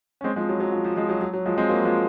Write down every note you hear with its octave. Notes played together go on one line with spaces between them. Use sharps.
C#4
G#3 C4
F3 G#3
F#3
F#3
F3
F3
F3 G#3
F#3
F#3
F#3
F3 G#3
G#3 C4
F#3 A#3
F3 G#3